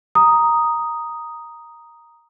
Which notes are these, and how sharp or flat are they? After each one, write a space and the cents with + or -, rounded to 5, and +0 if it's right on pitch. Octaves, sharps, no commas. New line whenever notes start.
A#5 +0 D#6 +0